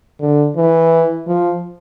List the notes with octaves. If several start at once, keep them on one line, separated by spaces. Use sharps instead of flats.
D3
E3
F3